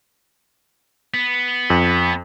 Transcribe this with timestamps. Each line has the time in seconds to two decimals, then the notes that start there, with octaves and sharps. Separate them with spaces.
1.14 B3
1.70 F2